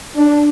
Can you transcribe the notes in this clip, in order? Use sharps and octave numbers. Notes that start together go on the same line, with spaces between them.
D4